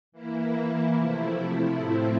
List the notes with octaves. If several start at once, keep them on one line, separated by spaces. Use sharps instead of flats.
E3 A#3 E4
C3 F3 A3 E4
A2 F3 A3 C4 E4